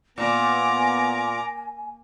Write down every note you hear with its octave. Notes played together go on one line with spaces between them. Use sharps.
A#2 B3 G#5 A#5 D6